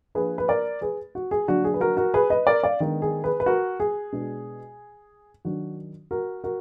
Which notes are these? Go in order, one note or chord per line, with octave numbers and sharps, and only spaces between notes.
F3 A#3 D4 G#4 B4
B4
A#4 D5
G#4 B4
F#4
G#4
D3 F#3 A#3 D4 F#4
G#4
B4
F#4 A#4
F#4 A#4
G#4 B4
B4 D#5
A#4 D5
D5 F5
D#3 G#3 B3 D4
G#4
G#4 B4
B4
F#4 A#4
G#4
B2 G#3 D4
D#3 F#3 D4 F#4
F#4 A#4
F#4 A#4